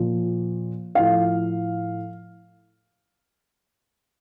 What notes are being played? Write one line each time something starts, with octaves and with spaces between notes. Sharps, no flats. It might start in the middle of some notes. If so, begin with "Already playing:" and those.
Already playing: A#2 F3
A2 F3 F5